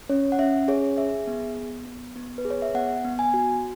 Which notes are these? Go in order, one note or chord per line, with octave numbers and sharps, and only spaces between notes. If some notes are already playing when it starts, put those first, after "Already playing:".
C#4 C#5
F#5
C#4 E5
G#4 C#5
G#4 E5
B3
B3
B3
B3
B4
G#4
C#5
E5
B3 F#5
B3
G#5
F#4